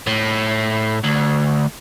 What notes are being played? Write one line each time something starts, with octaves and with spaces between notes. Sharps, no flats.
A2
D2